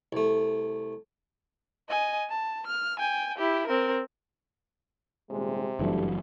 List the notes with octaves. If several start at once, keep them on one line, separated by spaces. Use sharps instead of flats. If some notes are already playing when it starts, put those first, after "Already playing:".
C2 A3
D#5 G#5
A5
F6
G5 G#5
E4 G4
C4 A#4
D#1 C3 G#3
F#1 G2 E3 F#3 A3